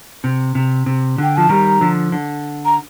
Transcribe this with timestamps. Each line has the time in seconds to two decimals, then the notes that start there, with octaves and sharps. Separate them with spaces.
0.24 C3
0.55 C3
0.86 C3
1.18 D3 G5
1.36 F3 A5
1.49 D#3 G3 A#5
1.81 D3 F3
2.12 D3
2.65 A#5